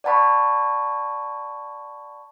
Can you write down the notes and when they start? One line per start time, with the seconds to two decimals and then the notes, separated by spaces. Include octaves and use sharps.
0.04 D5 F#5 A5 B5 C#6